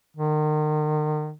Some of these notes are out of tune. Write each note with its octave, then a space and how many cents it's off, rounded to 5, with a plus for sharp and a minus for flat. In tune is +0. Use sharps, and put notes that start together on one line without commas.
D#3 -35